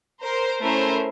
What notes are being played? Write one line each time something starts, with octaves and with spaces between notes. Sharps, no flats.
A#4 C5
A3 C#4 E4 A#4 C5